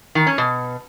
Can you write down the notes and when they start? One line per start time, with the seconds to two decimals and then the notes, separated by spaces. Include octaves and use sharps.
0.15 D#3
0.27 C#4
0.38 B2